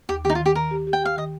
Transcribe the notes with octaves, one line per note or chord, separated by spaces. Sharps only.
D#2 G4
D#3 D#4 G4
F4
D#3
G4
D#3 A#4
G4
G4
G5
G4 F5
D#3 D#5